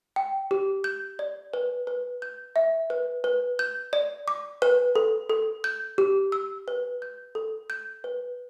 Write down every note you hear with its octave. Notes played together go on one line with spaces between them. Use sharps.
G5
G4
G6
D5
B4
B4
G6
E5
B4
B4
G6
D5
D6
B4
A4
A4
G6
G4
E6
B4
G6
A4
G6
B4